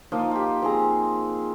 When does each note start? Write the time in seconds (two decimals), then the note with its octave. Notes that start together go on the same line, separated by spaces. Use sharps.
0.12 F3 A#3 D#4 F4
0.31 F4 G4
0.62 F3 C4 G#4 A#5